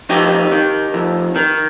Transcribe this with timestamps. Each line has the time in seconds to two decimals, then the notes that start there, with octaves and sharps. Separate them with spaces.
0.09 F2 D#4 G4
0.52 D#3
0.94 F2
1.36 D#3